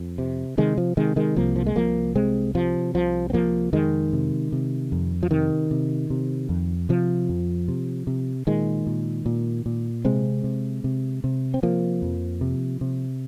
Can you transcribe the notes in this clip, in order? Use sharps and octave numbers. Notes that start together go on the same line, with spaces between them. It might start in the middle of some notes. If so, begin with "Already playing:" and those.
Already playing: F2
C3
C3 D#3 G#3
F3
C3 D#3 G#3
D#3 G#3
C2 F3 A#3
F3
G#3
C2 F3 A#3
C3 G#3 C4
C3 F3
C2 F3
C4
C3 F3 A#3
F2 D#3 G#3
C3
C3
F2
F3
C3 D#3
C3
C3
F2
C3 F3
F2
C3
C3
A#2 D#3 G#3
A#2
A#2
A#2
C3 G#3 C4
C3
C3
C3
C4
C3 F3 A#3
F2
C3
C3